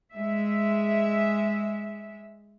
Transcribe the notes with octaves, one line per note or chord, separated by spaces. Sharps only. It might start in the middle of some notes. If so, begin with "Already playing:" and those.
G#3 E5